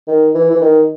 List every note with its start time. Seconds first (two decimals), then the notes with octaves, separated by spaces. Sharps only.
0.08 D#3
0.35 E3
0.51 E3
0.61 D#3